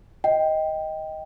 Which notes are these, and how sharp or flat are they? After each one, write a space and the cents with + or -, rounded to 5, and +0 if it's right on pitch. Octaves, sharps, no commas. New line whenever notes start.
D#5 +15 G5 +0